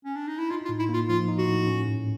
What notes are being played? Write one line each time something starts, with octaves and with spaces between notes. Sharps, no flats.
C#4
D4
D#4
E4
D#4 F4
F4
A2
E4
A#3
F4
F3 F4
D#4
F#4
A2
C#4
G#2